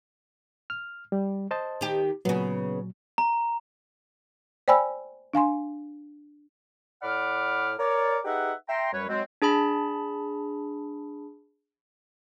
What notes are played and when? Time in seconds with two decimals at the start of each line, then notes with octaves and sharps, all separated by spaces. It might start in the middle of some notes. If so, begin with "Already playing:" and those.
0.70 F6
1.12 G3
1.51 C5 D#5 A5
1.81 D#3 G4
2.25 A#2 C#3 F#3 B3
3.18 A#5
4.68 C5 D5 G5 G#5 B5 E6
5.34 D4 F5 G#5 C6
7.02 A2 D5 F#5 B5 D6 F6
7.79 A#4 C#5 D5
8.25 D#4 G4 G#4 B4 E5 F#5
8.69 E5 G5 A#5 C6
8.92 F#2 G3 B4 C#5
9.08 F#3 G#3 C4
9.42 D4 G#4 A5 B5